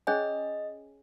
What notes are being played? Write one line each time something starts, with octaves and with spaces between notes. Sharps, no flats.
C#4 G#4 C#5 D#5 G#5